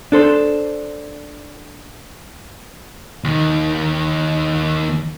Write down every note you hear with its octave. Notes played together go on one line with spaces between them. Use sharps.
D4 A4 C5
D#2 D#3